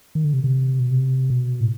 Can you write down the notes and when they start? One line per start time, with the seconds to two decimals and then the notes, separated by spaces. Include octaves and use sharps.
0.15 D#3
0.24 D3
0.33 C3
0.44 C3
0.79 B2
0.91 C3
1.30 B2
1.60 A2